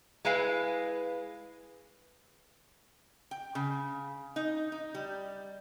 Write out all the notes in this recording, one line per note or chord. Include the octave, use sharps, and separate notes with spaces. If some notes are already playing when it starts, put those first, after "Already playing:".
G#3 E4 B4 F5 G#5
G5
C#3
D#4
D#4
G3